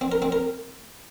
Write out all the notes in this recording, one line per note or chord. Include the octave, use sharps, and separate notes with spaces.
C4
A#4
C4
A#4